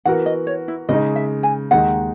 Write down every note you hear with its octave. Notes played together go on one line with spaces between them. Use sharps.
E3 B3 F#4 A#4 F#5
D#5
C#5
E4
C#3 G#3 D#4 D#5
E5
G#5
D#2 D#3 G#3 D#4 F#5